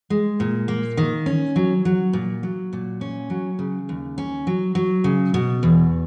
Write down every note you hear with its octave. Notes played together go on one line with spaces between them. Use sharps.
G#3
A#2
A#3
D#3
C#4
F#3
F#3
A#2
F#3
A#2
C#4
F#3
C#3
D#2
C#4
F#3
F#3
C#3
B2
E2